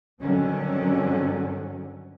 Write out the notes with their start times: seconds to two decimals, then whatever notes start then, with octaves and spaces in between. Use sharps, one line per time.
0.21 G2 D3 D#3 F#3 C4 C#4